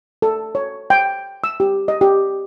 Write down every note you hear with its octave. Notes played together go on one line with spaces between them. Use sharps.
A4
C#5
G5
E6
G4
D#5
G4